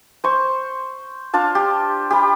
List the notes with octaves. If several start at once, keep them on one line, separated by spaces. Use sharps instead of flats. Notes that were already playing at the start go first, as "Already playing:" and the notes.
C5 C#6
D4 F4 A5
G4
G4 B5